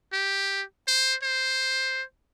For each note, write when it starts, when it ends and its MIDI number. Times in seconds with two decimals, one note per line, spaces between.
0.13 0.63 67
0.88 1.15 72
1.23 2.03 72